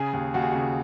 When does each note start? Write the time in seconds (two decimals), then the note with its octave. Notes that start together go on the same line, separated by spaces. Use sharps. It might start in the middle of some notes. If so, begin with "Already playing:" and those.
Already playing: C#3 G#4
0.13 D#2
0.34 D#2 F#4
0.42 G#4
0.51 F#4
0.55 C#3